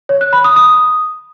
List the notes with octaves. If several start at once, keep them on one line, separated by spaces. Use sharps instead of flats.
C#5
F#6
B5
D#6
D#6